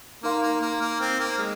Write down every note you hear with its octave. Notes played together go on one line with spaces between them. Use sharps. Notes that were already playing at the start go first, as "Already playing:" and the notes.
A#3 D#4 A#4 F5 C6
A#3
A#3
A#3
C4
A#3
G#3